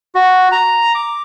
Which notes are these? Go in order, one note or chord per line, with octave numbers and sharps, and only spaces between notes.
F#4
A#5
D6